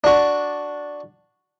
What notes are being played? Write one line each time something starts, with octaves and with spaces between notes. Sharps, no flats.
D4 F#4